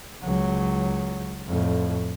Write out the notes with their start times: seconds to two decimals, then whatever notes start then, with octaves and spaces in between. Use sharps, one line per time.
0.23 C#2 F#3
1.48 F2 A2